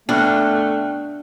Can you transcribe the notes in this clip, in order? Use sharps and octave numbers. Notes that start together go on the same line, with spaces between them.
B2 A3 D4 G5 F6 F#6